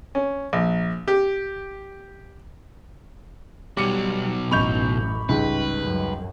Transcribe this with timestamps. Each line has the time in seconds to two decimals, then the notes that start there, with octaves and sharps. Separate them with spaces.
0.15 C#4
0.53 A#1
1.08 G4
3.77 B1 F#3 G3 D6 C#7 D#7
4.51 A1 F#2 D#5 B5 C#6 G6 F7
5.29 C#2 G#2 G3 B4
5.82 F#2